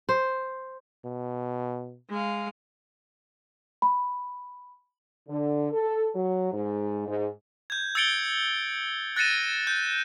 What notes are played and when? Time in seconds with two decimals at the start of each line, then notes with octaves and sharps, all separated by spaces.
0.09 C5
1.05 B2
2.10 G#3 F5
3.82 B5
5.29 D3
5.72 A4
6.15 F#3
6.52 G#2
7.07 G#2
7.70 G6 G#6
7.95 E6 G#6 A6 C#7 D7 G7
9.16 F#6 A6 A#6 C#7 D#7 E7
9.67 G6